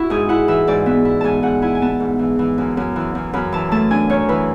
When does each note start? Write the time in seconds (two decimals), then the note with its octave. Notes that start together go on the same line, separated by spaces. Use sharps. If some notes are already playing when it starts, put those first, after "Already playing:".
Already playing: E4 F#4
0.10 G#2 G#4
0.29 E4 F#5
0.48 E3 E5
0.67 G#2 D5
0.86 B3 E5
1.05 E4
1.21 G#2 G#5 A5
1.43 G#2 F#5
1.62 E4 G#5
1.75 G#5
1.82 B3 A5
2.00 G#2
2.19 E3
2.39 E3
2.58 F#2
2.77 F#2
2.96 E3
3.15 F#2
3.33 F#2 B5
3.52 E3 A5
3.71 A3 A5
3.91 D4 G#5
4.10 F#2 C#5
4.29 E3 B4